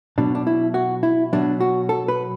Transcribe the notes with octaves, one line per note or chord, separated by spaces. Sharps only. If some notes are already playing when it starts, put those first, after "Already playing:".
B2 F#3 D4
D4
E4
F#4
E4
B2 F#3 D4
F#4
A4
B4